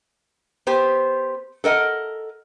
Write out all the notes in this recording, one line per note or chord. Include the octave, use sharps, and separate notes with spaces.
B3 G4 C5
A4 A#4 D#5 F#5